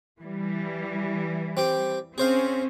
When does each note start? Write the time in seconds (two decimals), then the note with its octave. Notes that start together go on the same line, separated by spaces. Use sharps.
0.20 E3 G3
1.57 C4 G4 G5
2.18 C4 C#4 G#4 C5 F5